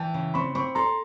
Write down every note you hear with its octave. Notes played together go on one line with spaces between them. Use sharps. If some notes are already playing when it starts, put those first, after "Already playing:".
Already playing: E3 G5 A5
C#3
C4 B5 C#6
C4 B5 C#6
A4 A#5 C6